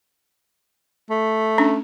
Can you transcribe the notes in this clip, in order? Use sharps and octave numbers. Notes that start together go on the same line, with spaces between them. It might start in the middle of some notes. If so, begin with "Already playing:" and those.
A3
C#4 D4